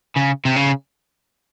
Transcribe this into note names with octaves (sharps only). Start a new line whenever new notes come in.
C#3
C3
C#3